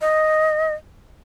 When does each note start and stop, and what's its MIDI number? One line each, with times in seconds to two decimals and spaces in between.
0.01 0.74 75